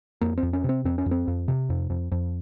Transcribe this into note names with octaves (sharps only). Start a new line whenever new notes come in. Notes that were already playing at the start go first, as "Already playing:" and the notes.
F2 A#3
C4
F2
C#4
C3 C4
F2 C4
C#4
F2
C4
F2
C3
F2
F2
F2